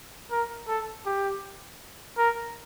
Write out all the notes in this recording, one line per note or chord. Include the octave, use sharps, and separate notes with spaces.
A#4
A4
G4
A#4